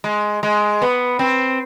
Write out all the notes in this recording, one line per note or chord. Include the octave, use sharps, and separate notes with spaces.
G#3
G#3
B3
C4